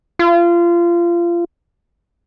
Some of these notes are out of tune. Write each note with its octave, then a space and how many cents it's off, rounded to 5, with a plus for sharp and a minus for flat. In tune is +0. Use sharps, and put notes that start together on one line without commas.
F4 -25